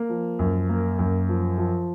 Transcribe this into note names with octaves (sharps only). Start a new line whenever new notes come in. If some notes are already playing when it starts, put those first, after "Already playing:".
Already playing: A#3
F3
F#2
A#3
F#2
F3
F3